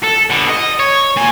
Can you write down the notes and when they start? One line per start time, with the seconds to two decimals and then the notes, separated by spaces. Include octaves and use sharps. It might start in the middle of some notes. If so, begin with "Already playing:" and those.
0.04 A4
0.30 D3 B3
0.50 D#5
0.79 C#5
1.17 A#2 G#5